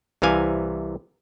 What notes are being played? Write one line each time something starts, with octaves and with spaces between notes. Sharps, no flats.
C2 C3 E3 F5 G#5